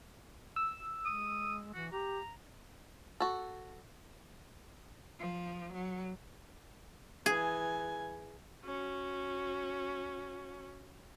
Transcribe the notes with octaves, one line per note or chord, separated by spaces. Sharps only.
E6
G#3 D#6
E3 F#4
G4 A#5
F#4 A4
F3
F#3
E3 G#4 G#5
C#4 F#4